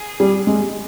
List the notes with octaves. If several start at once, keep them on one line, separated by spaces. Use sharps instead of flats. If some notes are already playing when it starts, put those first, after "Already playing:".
Already playing: G#4
G3
G#3